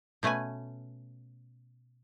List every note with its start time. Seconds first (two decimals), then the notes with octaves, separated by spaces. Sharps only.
0.23 B2 A3 C#4 B4 G#5